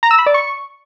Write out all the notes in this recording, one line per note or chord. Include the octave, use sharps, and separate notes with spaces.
A#5
E6
B5
D5
C#6